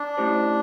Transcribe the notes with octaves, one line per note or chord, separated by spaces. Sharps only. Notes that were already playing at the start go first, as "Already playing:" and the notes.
Already playing: D4
A3 C#4 E4 G4 C5